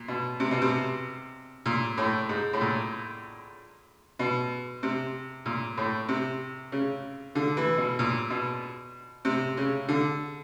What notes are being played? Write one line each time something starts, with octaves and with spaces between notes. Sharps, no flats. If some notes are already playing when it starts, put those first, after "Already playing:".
Already playing: A#2
B2
C3
B2
C3
A#2
A2
G#2
A2
A#2
B2
C3
A#2
A2
C3
C#3
D3
E3
B2
A#2
B2
C3
C#3
D3